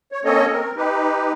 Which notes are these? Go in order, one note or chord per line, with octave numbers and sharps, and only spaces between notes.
C#5
A#3 C4 C#4 A4 C#5 D#5
C4 A#4
D#4 G4 B4